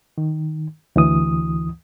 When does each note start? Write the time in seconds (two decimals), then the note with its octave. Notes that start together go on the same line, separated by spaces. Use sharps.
0.18 D#3
0.96 D2 E3 D#6